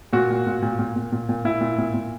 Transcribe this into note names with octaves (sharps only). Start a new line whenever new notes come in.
A#2 F#4
A#2
A#2
A#2
A#2
A#2
A#2
A#2
A#2 E4
A#2
A#2
A#2